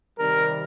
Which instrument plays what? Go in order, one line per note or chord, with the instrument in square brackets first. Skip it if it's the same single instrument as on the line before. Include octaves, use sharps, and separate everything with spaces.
[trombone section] C3 D#3 G3 A#4